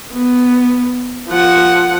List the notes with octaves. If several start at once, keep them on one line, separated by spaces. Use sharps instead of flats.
B3
F3 F#5